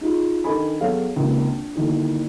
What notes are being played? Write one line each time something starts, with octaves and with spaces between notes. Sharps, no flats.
D#4 F4 G#4
D#3 D4 A4 D#5 G#5 B5
F#3 B3 F#4 G#4 A4 F5
C#2 C3 D#3 A#3
D4
G1 D2 D#3 A#3 E4